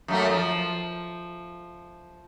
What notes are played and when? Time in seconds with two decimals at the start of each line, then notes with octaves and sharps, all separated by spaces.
0.08 F#2 A3 A#3
0.29 F3